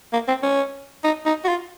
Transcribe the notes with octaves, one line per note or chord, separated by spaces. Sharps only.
A#3
C4
C#4
D#4
D#4
F#4
F4